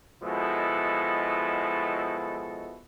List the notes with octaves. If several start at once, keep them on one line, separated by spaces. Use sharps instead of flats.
B2 F3 G#3 E4 F#4 A4